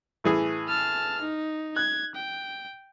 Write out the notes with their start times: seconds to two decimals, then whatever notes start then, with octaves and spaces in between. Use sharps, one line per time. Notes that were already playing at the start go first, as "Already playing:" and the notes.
0.24 A2 E3 G#4
0.69 A5 F6
1.22 D#4
1.76 F#6 G#6
2.15 G5